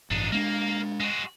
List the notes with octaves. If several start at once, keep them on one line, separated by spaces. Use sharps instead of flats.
A1 G2 D4 D#4
G#3 A#3 C4 D4
G#3 F#4